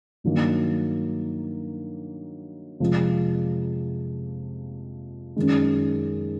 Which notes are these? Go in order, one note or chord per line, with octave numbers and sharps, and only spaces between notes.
G2 D#3 F#3 A#3
F2 C3 F3 G#3
F#2 D#3 G#3